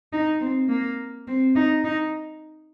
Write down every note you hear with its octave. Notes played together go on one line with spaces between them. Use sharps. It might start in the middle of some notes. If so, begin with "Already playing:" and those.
D#4
C4
A#3
C4
D#4
D#4